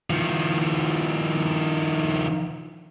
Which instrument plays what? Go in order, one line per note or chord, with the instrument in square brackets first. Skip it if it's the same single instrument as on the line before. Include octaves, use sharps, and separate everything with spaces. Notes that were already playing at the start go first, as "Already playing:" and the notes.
[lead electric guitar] D#3 F3